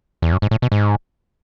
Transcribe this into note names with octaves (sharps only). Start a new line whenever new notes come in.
E2
F#2
G#2
A2
B2
G#2